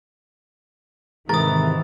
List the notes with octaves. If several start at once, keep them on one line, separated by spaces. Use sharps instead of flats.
G#2 C3 D#3 E3 A#4 D#6 A6